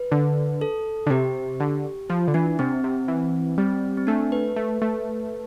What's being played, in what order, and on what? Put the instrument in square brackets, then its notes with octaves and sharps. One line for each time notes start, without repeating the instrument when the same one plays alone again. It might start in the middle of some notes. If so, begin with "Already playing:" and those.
Already playing: [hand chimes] B4
[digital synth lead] D3
[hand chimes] A4
[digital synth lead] D3
[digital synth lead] C3 [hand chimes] G4
[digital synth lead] D3
[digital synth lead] F3 [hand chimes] F4
[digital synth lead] D3
[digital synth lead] E3 [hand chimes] D4
[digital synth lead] C3 [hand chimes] C4
[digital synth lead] C3
E3
[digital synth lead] G3 [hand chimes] C4
[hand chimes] C4
[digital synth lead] A3 [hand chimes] D4
[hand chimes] B4
[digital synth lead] A3
A3